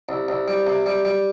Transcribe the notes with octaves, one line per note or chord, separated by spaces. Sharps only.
C2
C2
G3
C3
G3
G3